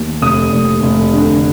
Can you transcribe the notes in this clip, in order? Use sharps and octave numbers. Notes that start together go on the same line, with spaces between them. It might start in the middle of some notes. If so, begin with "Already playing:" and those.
Already playing: D#2
F1 D#6
F1
F1
D3